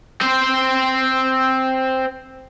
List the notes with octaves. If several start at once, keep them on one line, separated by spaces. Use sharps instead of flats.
C4 C5